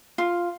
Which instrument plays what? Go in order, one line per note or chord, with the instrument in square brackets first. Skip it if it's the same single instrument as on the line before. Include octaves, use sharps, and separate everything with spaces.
[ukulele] F4